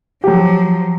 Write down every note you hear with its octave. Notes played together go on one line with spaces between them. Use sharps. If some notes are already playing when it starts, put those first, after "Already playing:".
F3 F#3 G4